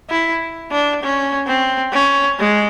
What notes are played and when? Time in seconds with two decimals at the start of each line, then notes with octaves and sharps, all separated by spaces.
0.10 E4
0.72 D4
1.03 C#4
1.47 C4
1.93 C#4
2.39 G#3